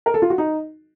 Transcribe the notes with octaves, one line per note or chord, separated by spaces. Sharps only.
A#4
A4
F4
F#4
D#4